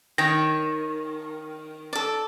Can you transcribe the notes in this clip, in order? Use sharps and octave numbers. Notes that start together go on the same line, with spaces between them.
D#3 C#5 G5 A#6
A4 D5